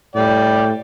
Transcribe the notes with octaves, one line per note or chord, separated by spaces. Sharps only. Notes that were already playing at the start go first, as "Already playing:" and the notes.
A2 D5 G5